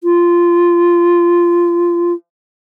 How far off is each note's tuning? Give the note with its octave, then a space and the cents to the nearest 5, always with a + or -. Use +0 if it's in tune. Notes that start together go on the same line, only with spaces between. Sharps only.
F4 -15